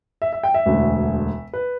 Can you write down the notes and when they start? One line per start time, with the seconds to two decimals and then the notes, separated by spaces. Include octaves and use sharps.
0.22 E5
0.33 E5
0.43 G5
0.54 E5
0.65 E1 D2 D3
1.53 B4